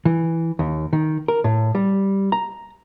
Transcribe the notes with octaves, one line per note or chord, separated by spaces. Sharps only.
E3
D#2
D#3
A#4
A2
G3
A#5